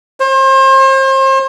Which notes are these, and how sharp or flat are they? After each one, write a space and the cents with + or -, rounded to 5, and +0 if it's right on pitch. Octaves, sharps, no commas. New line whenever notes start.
C5 +35